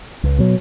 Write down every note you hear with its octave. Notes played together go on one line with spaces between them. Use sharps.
C#2
B2 F#3